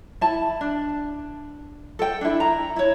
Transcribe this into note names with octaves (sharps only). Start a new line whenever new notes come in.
E4 A5
D4
A4 G5
D4 E4
A#5
E4 C#5